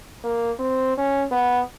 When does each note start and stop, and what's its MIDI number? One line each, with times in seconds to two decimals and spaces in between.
0.24 0.52 58
0.59 0.94 60
0.98 1.24 61
1.32 1.61 59